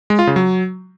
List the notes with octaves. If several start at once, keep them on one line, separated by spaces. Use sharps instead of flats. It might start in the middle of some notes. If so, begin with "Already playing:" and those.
G#3
F4
C#3
F#3